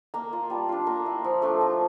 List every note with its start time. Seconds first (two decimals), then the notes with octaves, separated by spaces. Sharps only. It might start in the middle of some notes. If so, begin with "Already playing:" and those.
0.14 A#3 A#5
0.33 F4
0.50 G3 A5
0.69 D4 F4
0.87 A#3 A#5
1.06 E4
1.24 F3
1.42 A3 D4 F4
1.60 A3 A#5